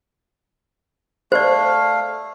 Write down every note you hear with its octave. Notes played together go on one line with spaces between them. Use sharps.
A3 C5 D5 F5